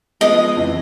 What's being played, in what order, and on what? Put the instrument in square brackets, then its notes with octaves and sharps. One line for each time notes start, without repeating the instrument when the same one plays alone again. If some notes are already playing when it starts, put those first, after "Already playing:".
[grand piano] F3 G#3 B3 [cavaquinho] D#5
[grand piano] F2 C#3 E3